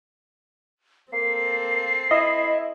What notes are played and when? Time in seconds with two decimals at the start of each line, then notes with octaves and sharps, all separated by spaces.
1.13 A#3 C4 A4 C7
2.11 E4 D#5